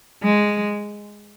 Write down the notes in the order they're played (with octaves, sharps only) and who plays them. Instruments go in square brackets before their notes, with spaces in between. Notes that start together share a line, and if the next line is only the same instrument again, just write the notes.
[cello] G#3